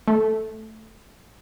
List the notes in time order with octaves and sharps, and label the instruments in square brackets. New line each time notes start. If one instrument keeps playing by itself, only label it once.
[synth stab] A3